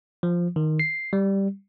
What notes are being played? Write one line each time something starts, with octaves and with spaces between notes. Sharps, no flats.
F3
D#3
C7
G3